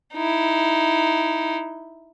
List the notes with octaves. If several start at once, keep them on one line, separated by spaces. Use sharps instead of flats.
D#4 E4